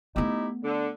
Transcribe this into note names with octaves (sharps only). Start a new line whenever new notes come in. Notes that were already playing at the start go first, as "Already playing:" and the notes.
A3 B3 D#4 E4 G4
D3